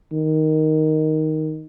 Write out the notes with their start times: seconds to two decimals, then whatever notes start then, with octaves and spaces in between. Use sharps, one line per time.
0.12 D#3